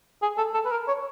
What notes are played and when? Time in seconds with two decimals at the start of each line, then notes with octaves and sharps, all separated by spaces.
0.22 G#4
0.37 A4
0.54 A4
0.65 B4
0.71 A#4
0.88 C#5